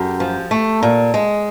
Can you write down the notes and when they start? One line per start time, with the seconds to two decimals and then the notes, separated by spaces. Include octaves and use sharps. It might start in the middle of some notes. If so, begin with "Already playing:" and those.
Already playing: F#2 G4 A4
0.20 F3
0.51 A3
0.83 A#2
1.14 G#3